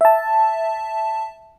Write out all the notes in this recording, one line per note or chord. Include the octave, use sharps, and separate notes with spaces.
E5 A5